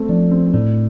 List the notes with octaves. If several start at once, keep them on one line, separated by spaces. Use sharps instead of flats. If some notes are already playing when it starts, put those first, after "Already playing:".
Already playing: A3 C4
F3 D4
C4
C4
A2 D4